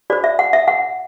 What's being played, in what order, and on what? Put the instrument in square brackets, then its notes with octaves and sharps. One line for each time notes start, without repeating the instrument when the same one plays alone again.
[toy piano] F#4 C5 D5
E5
F#5
E5
F#5